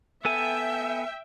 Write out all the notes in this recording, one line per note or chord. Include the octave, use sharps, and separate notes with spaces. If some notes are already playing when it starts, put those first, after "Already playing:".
B3 A4 E5 G5 G#5